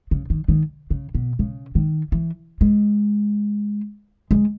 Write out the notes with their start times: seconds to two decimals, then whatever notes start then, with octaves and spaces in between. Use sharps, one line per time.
0.11 C#3
0.30 D#3
0.48 D#3
0.90 C#3
1.15 B2
1.39 C#3
1.75 D#3
2.12 E3
2.61 G#3
4.31 G#3